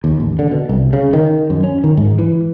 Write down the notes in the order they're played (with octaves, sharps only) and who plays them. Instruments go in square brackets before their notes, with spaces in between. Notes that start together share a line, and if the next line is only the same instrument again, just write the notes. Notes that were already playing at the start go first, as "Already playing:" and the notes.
[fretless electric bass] D#2
A1
D3
B2
C2
C#3
D#3
F#2
C#4
D#3
G#2
E3